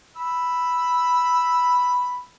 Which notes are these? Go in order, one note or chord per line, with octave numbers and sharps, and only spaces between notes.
B5 E6